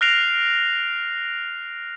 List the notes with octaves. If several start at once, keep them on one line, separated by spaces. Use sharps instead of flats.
F6 F#6 A#6 C7 D7 F7